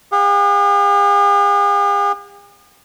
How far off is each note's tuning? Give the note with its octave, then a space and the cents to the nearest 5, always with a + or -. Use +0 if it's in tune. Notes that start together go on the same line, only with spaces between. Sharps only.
G#4 -45 F#5 -35